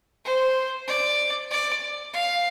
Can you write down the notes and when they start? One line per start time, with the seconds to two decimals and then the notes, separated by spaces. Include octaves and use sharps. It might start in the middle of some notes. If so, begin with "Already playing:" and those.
0.25 C5
0.87 D5
1.51 D5
2.13 F5